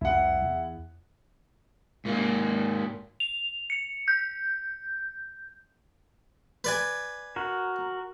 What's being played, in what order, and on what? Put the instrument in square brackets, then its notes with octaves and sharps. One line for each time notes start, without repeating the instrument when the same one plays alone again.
[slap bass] C2 F2 [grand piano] E4 F#5
[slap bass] E2
[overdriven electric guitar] G#2 A#3
[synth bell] F7
C#7
G6
[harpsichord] B4 D5 G#5
[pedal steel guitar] F#4 A#4